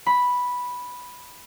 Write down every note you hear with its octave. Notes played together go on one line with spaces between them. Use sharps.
B5